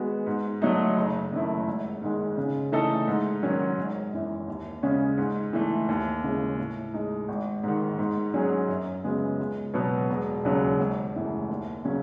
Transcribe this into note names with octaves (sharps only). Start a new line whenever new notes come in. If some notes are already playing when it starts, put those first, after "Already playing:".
Already playing: D#3 G#3 B3 F#4
G#2
F#3 A3 D#4
F#1
F#2 D#3 A3 E4
G#1
G#2 D#3 G#3
C#3
E3 A3 D#4 A4
G#2
D#3 F#3 C#4
G#1
F#2 E3
D#2
C#3 G#3 C#4
G#2
E3 A3
D#2
C#3 E3 G#3
A2
G#3 D#4
G#1
G#2 D#3
G#2
F#3 C#4 G#4
F#2
C#3 G#3 B3 F#4
C#2
B2 F#3 B3
E1
D#2 C#3 F#3
G#1
F#2 E3 A3
D#2
C#3 F#3 C#4